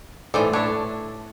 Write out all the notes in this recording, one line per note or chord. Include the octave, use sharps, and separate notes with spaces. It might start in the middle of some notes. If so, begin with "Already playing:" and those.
A2 E3 A4 C5 D5
D4 C#5 E5